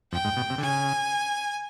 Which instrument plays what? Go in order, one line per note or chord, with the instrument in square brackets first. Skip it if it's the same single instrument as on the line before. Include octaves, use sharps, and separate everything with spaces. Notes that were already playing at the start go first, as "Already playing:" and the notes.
[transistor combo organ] F2 [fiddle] G5
[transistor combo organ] G#2
B2
C3
D3
[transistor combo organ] C#3 [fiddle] G#5